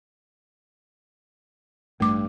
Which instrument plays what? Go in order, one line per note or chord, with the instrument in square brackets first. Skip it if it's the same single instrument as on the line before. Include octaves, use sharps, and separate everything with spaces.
[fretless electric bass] A1 G2 [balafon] A3 D6